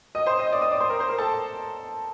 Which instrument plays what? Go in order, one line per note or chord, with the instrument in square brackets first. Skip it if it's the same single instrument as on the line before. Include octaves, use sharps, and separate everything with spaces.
[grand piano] D#5 D#6
C5 C6
D#5 D#6
D5 D6
D#5 D#6
D5 D6
C5 C6
A#4 A#5
C5 C6
A#4 A#5
A4 A5